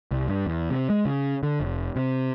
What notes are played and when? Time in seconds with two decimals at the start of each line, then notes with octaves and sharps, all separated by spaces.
0.11 C2
0.28 G2
0.46 E2
0.70 C3
0.90 G#3
1.05 C#3
1.43 D3
1.60 F1
1.96 C3